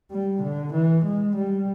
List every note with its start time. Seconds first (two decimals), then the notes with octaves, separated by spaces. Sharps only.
0.11 G3
0.43 D3
0.74 E3
1.05 G#3
1.36 G3